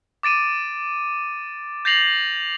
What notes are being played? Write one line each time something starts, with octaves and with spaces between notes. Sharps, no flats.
D6 A6 D7 D#7
G6 A6 A#6 C7 F7 F#7